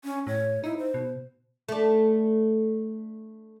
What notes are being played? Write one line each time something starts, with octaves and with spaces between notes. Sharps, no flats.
C#4
A2 C#5
D#4 E4
C5
B2
A3 D4